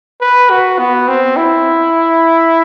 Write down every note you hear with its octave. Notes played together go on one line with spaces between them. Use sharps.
B4
F#4
B3
C4
E4